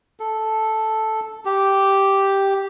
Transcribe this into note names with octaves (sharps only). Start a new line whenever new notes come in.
A4
G4